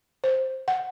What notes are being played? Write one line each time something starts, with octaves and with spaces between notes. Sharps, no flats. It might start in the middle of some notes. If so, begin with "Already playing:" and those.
C5
F#5